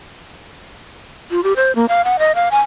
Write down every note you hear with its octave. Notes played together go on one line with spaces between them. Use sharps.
F4
G4
C5
A#3
F5
F#5
D#5
F5
G#5